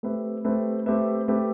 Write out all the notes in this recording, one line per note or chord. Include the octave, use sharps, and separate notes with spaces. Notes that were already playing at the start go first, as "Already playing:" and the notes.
A3 C4 G4 B4 E5
A3 C4 G4 B4 E5
A3 C4 G4 B4 E5
A3 C4 G4 B4 E5